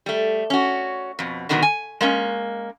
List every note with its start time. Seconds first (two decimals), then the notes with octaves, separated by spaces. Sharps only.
0.06 G3 A3
0.50 C#4 F#4
1.19 F2 B2
1.49 B2 D3 D#3 F#3 G#3 B3
1.62 G#5
2.01 G#3 A#3 C#4